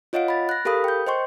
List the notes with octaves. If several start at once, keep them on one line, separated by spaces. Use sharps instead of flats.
F4 C#5 D#5 F5 F#5 D7
B5 A6
F#6 A#6
G4 A4 A#4 F5 B5 D#6
G5 G6
C5 D#5 G5 C6 C#6